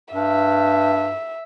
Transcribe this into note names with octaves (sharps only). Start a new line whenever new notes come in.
G2 E5